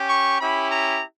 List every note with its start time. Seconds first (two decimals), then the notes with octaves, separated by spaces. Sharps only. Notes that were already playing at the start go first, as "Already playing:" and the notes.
Already playing: C#4 G4
0.08 C#6
0.40 C#4 E4 G4 B5
0.70 A#5